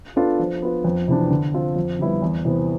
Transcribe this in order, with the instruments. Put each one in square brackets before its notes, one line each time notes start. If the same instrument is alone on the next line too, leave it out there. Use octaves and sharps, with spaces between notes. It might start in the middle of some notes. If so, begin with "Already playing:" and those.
[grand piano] B3 D4 F4 A4
F3
B3 F4
F2
C3 E3 B3 D4
D3
F3 C4 F4
F2
D3 G3 B3 E4
E2
C3 E3 B3